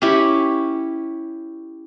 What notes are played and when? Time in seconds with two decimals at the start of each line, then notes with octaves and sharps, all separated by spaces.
0.02 C#4 E4 G4